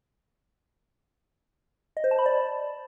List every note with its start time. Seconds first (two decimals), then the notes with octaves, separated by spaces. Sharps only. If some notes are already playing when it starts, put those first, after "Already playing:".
1.97 D#5
2.04 C5
2.11 A5
2.19 B5
2.26 D5